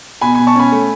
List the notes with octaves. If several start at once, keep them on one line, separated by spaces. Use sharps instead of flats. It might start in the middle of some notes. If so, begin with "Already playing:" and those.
B2 G#5 B5
G#5 B5
B2
A5 C#6
C#4 G#5 B5
A3